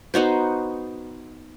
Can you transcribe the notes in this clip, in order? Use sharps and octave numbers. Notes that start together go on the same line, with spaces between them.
B3 D#4 F#4 C5